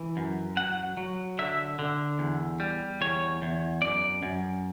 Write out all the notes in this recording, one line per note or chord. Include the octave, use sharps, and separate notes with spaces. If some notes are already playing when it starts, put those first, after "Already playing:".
Already playing: E3
F#2
F#3 F#5
F#3
D3 E5
D3
E2
G3
E2 C#5
E2
F#2 D5
F#2